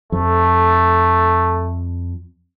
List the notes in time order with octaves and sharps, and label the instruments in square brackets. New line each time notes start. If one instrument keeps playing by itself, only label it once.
[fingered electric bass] F2 [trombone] A3